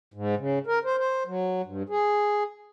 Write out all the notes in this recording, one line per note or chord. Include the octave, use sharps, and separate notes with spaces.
G#2
C#3
A#4
C5
C5
F#3
G2
G#4